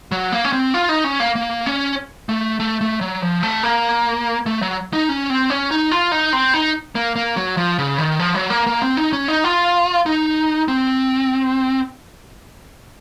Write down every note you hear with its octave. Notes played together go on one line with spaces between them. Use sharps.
F#3
A#3
C#4
C4
F4
D#4
C#4
A#3
A#3
C#4
A3
A3
A3
F#3
F3
A3
A#3
A3
F#3
D#4
C#4
C4
C#4
D#4
F4
D#4
C4
D#4
A#3
A#3
F#3
F3
C#3
D#3
F3
F#3
A#3
A#3
C4
D#4
C#4
D#4
F4
D#4
C4